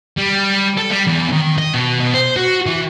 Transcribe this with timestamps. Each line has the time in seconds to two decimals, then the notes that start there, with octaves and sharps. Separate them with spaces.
0.18 G3
0.78 A4
0.91 G3
1.07 E2
1.33 D#3
1.58 D#5
1.74 B2
2.00 B2
2.14 C5
2.37 F#4
2.66 E3